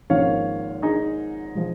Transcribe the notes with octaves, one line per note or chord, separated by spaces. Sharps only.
G#1 G#2 F3 A#3 C#4 C#5 F5
D#4 G#4
F3 G#3